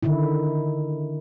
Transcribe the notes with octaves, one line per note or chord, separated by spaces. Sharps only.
D3 D#3 E4